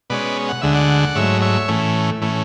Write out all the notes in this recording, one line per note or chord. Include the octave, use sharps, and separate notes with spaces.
B2 G#3 C#4 B4 D5
F#5
D2 D3 G#3 E5
D5 F#5
G#2 F#3 A3 C#5 E5
C#5 E5
A2 E3 A3 C#4
A2 E3 A3 C#4